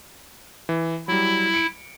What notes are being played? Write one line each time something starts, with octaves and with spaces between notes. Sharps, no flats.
E3
F#3 G3 E4
C#7 D7